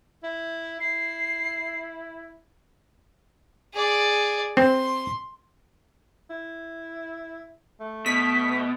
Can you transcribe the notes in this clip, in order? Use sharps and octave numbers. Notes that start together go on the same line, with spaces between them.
E4
E4 C7
G#4 D5
C4 C6
E4
A3
B2 B6